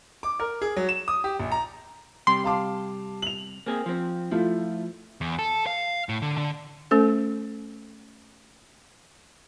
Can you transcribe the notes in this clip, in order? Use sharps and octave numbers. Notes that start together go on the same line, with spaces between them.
D6
A#4
G#4
F#3
E7
D#6
G4
A#1
A#5
C3 G3 G4 C6
F5 A5 D6
F7 F#7
A#3 C4 G#4
F3 C4
F3 A3 E4 F4
E2
A4
F5
A2
D3
D3
A3 C#4 A4 C5